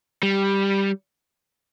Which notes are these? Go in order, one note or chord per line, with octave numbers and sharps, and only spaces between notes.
G3